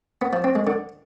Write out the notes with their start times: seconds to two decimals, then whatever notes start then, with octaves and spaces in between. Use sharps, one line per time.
0.22 B3
0.33 F3
0.44 C4
0.55 G#3
0.67 D3